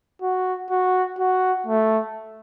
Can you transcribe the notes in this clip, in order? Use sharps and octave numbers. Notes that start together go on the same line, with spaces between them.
F#4
F#4
F#4
A3